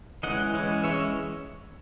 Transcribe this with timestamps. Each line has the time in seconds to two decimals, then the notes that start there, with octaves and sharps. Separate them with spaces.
0.23 E3 G#3 C#4 D#5 F#5
0.54 E3 G#3 C#4
0.83 E3 G#3 C#4 C#5 E5